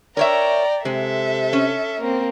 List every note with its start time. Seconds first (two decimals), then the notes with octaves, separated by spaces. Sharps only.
0.17 A#4 C#5 D5 E5 G5 A#5
0.85 C3 G#3 A4 E5
1.53 C#4
2.01 A#3 C4